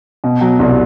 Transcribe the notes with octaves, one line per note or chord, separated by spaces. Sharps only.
B2
F#3
C2